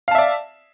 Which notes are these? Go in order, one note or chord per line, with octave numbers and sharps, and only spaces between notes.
D5 E5 F5 A5